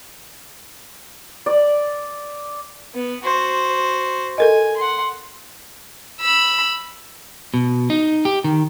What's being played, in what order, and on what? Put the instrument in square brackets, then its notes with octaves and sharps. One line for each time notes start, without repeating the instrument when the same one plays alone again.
[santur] D5
[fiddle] B3
F#4 C5
[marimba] A4 A#4 D#5 [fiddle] G#5
[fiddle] F#5 C6
[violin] B5 E6
[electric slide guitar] B2
D#4
G4
D#3